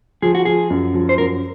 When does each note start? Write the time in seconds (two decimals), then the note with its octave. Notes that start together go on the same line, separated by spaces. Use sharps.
0.22 F3 G#4
0.35 F#4
0.45 F3 G#4
0.70 F#2
0.94 F3
1.09 C5
1.18 F#2 A#4